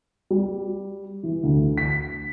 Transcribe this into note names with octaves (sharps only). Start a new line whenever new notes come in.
G3
E3
D2
B6